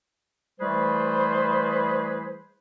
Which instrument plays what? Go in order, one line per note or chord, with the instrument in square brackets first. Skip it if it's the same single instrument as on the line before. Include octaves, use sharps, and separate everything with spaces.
[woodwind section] E3 G3 A3 G#4 B4 C5